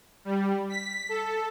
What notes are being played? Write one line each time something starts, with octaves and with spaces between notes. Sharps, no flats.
G3
B6
A4